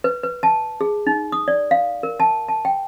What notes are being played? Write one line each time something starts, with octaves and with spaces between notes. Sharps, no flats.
B4
B4
A5
G#4
D#4
D#6
D5
F5
A#4
A5
A5
G5